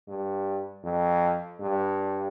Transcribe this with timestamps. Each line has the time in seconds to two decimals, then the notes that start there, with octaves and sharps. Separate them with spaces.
0.08 G2
0.84 F2
1.60 G2